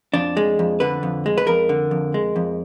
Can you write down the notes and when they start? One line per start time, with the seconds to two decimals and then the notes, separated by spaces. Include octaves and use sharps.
0.14 F2 D4
0.37 G#3
0.59 F2
0.80 D3 B4
1.03 F2
1.26 G#3
1.38 B4
1.47 F2 A#4
1.69 D3
1.91 F2
2.14 G#3
2.36 F2